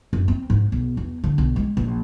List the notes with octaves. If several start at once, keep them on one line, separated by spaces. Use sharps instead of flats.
F#2
C4
G#2
B1
E2
D3
B1
G#3
A#1